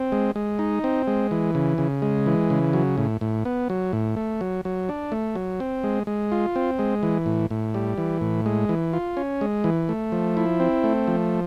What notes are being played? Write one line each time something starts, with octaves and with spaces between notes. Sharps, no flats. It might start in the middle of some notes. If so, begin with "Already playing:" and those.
Already playing: C4
G#3
G#3
D#4
C4
G#3
E3
C#3
C#3
G#3
E3
C#3
F#3
A2
A2
B3
F#3
A2
A3
F#3
F#3
D4
A3
F#3
C4
G#3
G#3
F4
C4
G#3
E3
A2
A2
G3
E3
A2
G#3
E3
F4
C#4
G#3
E3
A3
F3
E4
C4
A3
F3